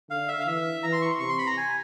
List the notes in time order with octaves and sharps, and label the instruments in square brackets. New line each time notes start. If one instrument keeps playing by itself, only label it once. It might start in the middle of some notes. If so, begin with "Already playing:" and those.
[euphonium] D3 [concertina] F5
[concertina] E5
F5
[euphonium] E3 [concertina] E5
[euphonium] E3 [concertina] A#5
[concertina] C6
C#6
C6
[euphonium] C3 [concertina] C#6
[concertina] C6
B5
A#5
G#5